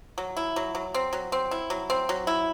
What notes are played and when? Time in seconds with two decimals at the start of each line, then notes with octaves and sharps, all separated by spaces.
0.18 F#3
0.37 E4
0.56 F#3
0.75 F#3
0.94 C4
1.13 F#3
1.32 C4
1.51 E4
1.70 F#3
1.90 C4
2.09 F#3
2.27 E4